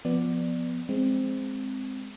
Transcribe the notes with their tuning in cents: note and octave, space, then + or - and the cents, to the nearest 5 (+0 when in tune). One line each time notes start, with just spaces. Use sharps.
F3 -5 B3 +0 D5 +5
G#3 +0 C4 +0